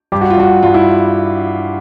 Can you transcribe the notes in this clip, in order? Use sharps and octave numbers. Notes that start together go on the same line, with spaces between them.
G2 G4
F#4
F4
G2 F#4
G2 F4
E4